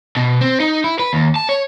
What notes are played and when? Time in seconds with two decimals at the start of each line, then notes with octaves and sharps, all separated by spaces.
0.17 B2
0.41 C4
0.60 D#4
0.84 E4
0.99 B4
1.13 D#2
1.36 A5
1.49 C#5